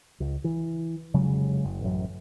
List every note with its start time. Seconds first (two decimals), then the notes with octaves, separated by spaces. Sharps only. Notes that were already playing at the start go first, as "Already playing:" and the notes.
0.20 C#2
0.44 E3
1.14 F1 C#3 F#3 G#3
1.64 F#1
1.81 A1 F#2